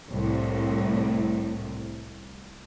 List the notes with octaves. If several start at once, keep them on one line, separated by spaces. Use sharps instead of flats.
C2 A2